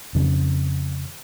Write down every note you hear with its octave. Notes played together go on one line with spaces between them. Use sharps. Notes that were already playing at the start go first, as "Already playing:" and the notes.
F2 C#3